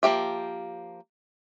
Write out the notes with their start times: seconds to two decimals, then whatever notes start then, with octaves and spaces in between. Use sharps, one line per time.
0.03 F3 A#3 G4 E5